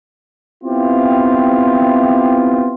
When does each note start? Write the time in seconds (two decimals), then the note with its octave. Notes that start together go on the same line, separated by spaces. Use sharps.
0.64 B3 C4 E4 F4 G4 F5